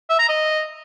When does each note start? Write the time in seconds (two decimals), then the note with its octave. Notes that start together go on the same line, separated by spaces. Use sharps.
0.09 E5
0.19 A#5
0.29 D#5